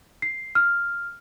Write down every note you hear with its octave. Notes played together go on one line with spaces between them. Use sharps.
C7
F6